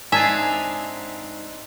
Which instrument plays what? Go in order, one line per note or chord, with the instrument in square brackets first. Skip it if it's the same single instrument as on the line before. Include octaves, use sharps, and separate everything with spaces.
[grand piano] G#2 [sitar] C4 D4 D#4 [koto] E5 [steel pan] G#5 A5